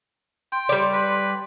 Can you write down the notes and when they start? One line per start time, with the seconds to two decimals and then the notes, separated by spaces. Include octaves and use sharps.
0.52 G5 C6
0.69 G3 D5
0.93 B4